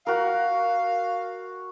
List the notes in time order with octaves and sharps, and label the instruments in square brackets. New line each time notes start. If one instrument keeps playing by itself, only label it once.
[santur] F#4 A#4 [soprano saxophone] F5